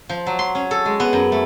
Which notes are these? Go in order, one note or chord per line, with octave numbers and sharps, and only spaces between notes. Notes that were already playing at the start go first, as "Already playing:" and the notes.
F3
F#3
C6
C#4
A4
G#3
B3
F#2
A3